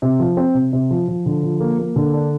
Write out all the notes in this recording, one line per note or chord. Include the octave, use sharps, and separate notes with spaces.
C3
F3
C4
C3
C3
F3
F3
D3
F3
A#3
A#3
D3
D4